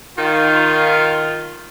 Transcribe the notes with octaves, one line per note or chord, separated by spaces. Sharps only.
D#3 F4